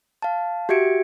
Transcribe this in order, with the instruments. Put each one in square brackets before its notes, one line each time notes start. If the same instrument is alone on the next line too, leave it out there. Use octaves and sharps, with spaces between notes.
[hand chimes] F5 A5
F#4 G4 E5 G#6 C#7 D7